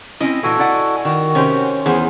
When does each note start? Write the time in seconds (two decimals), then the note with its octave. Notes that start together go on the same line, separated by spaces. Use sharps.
0.20 C4 C#4 E4 D#5
0.43 A#2 E3 F#4 A4 G#5
0.59 E4 D5 F#5
1.05 D#3 F#4
1.35 C3 C#4 G4 C5
1.86 E2 G#4 C5